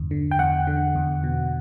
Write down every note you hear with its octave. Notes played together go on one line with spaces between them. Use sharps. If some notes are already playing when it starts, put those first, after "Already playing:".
Already playing: E2 G2 D3
D3
G5
E2 F#5
D3
E2
B2